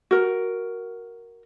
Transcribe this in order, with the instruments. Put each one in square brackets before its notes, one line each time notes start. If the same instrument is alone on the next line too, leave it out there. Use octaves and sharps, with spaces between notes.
[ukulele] F#4 A#4